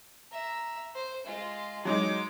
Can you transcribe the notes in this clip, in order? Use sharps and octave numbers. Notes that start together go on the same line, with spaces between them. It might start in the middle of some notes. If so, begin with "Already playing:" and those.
E5 A#5
C5
G#3 F4
F#3 G#3 D#4 D6